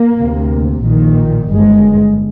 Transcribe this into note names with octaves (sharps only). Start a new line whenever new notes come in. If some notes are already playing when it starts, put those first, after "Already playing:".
Already playing: A#3
D2 C3
A#1 A#2 D#3
G1 G2 G#3